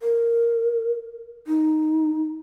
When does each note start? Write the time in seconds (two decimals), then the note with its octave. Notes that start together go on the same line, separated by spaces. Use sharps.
0.01 A#4
1.47 D#4